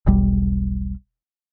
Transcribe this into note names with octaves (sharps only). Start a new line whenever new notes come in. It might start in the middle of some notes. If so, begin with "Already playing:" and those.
E1 B1 G3